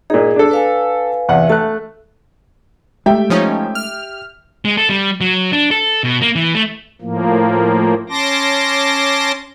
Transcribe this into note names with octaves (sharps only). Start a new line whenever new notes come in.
A#2 D#4 G#4
D4 A4
B4 F5 G#5
E2 C3 F#5
A3 A5 F#6
G#3 A3 G4 E5 G5
F3 C#4 D#4
F6
G#3
A4
G3
F#3
D4
A4
B2
A#3
E3
A3
A2 F3 A#3
C#4 A5 C6 D6 A#6